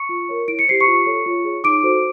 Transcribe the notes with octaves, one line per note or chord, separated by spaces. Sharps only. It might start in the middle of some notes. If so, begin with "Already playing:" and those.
Already playing: C#6 C#7
F4
A#4 C#5
E4 D7
C#7
G4 C5 C7
C#6 C#7
F4
A4 C#5
F4
G#4 C#5
D#4 D6 D7
F#4 A4 C5